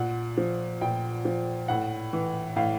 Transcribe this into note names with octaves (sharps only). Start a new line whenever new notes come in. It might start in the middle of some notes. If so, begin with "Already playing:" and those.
Already playing: A#2 F#5
F3
A#2 G5
F3
A2 F#5
E3
A2 F5